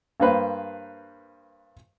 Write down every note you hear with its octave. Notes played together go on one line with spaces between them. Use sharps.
G2 A#3 B4 C5